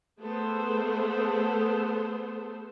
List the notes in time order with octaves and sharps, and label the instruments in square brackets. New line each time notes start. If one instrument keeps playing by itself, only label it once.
[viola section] A3 B3 G#4 A4 C5